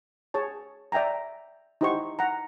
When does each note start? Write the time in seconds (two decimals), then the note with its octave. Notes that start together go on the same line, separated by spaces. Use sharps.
0.34 G#4 C#5 A5
0.92 D5 E5 G5 G#5 A#5
1.81 D#4 E4 G4 C5 F#5 C#6
2.19 F#5 A#5